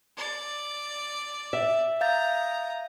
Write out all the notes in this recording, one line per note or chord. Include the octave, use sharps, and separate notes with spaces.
D5
E5
F5 A#5 D#6 G6 A6